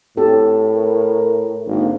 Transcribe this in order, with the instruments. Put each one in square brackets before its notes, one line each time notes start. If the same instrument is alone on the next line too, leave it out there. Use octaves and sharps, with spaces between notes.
[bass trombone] A2 [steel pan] C4 G4 A4
[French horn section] A#4
[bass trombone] G#1 [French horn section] D3 D#3 A#3